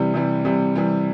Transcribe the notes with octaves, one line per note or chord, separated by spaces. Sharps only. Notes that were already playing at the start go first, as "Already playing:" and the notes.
Already playing: C3 E3 G3
C3 E3 G3
C3 E3 G3
C3 E3 G3